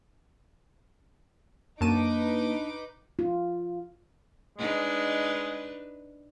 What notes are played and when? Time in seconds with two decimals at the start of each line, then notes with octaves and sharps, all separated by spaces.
1.81 F#2 A#3 D4 D#4 B4 A5 D6 D#7
3.19 F4
4.58 G#3 D4 D#4 B4